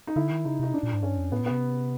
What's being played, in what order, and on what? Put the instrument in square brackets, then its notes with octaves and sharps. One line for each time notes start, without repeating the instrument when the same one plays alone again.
[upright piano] D#4
[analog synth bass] D3 [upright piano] E4
[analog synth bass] D#3
[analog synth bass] C#3 [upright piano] D#4
[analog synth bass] C3 [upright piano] D#4
[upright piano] D4
[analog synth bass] A#2
G#2
[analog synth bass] G2 [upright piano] C#4
[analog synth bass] F2
[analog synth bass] A2 [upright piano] B3
[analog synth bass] A#2
[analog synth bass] C3 [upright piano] B3